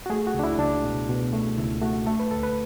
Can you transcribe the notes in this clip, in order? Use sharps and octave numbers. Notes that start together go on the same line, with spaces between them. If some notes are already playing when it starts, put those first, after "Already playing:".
F#4
A3 G#4
F#4
C#2
D4
E4
C#2 D4
B2
B2
A3
C#2 E4
A3 F#4
A3 A4
B4
D2 A4
B4